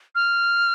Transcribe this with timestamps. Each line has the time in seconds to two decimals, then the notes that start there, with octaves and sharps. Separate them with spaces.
0.15 F6